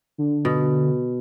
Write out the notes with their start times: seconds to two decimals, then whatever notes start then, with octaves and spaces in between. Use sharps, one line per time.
0.18 D3
0.45 B2